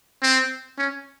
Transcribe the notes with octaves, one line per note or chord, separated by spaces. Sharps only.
C4
C#4